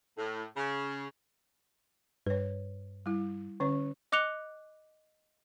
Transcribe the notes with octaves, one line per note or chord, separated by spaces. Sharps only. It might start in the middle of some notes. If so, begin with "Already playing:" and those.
A2
C#3
G2 B4 C#5
G3 E4
D3 C#4 C#5
D#5 D6 F#6 C#7 F7 G7